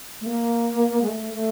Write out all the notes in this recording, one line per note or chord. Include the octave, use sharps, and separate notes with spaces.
A3
A#3
G#3
A3
A3